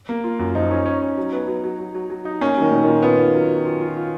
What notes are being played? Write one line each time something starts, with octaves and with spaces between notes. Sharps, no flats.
A#3
F4
F#2
F3 D#4
C#4
C#4
C#4
F#3
B3
F#3
F#3
F#3
F#3
F#3
D#4
A#3 C#4
D#3 F#3
A#2
D#3 F4
B3 F4
F4
F#3
F#3
F4
F4
F4